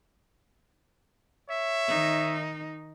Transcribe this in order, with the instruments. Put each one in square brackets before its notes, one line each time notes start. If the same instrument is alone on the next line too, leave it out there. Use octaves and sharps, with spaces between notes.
[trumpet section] C#5 E5
[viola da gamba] D#3 D#4